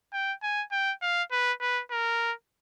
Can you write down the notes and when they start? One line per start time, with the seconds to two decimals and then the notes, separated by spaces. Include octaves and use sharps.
0.13 G5
0.43 G#5
0.72 G5
1.02 F5
1.32 B4
1.61 B4
1.91 A#4